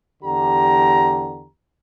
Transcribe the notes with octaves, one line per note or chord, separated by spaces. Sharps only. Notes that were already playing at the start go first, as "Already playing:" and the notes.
E2 D3 G4 A#5